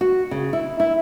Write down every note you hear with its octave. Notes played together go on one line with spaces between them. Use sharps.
F#4
C#3
E4
E4